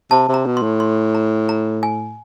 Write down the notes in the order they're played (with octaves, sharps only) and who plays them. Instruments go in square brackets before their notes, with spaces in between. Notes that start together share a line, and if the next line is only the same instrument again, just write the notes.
[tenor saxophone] C3 [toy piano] A5
[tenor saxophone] C3
[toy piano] A#5
[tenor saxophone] B2
[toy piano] C6
[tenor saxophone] A2
[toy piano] C6
A#5
A#5
G#5